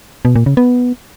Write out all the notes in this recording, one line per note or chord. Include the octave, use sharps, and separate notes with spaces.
B2
A#2
C#3
B3